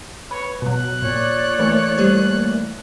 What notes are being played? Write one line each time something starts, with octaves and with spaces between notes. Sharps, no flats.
B4 C#5
B2 F#3 F#6
A#2 C#5 D5
E3 A3 A#3
G3 G4 C5